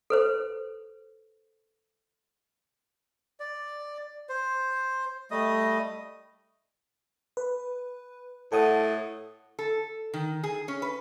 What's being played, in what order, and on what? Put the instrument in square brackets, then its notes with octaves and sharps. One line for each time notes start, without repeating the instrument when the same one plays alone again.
[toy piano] A4 B4 C5
[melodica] D5
C5
G3 A3 D#5 D#6
[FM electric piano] B4
[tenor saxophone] A2 [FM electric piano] A4 F#5 D#6
[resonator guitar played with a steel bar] A4
D#3
G#4
C#4
B4